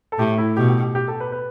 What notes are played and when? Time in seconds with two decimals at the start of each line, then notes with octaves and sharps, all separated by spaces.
0.12 A4
0.19 A2 G4
0.38 E4
0.57 B2 G4
0.69 G4
0.82 G4
0.95 G4
1.08 A4
1.20 B4
1.32 B4